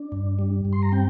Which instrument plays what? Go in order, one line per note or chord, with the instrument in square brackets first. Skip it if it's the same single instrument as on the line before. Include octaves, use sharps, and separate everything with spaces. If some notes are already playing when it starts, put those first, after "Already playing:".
Already playing: [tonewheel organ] D4
G2
G3
G2
C6
A#5
C4 G5